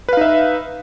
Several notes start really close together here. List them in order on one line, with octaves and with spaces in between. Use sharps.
B4 F5 D#4 E5